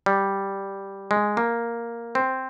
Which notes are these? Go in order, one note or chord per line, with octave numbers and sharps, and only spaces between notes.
G3
G#3
A#3
C4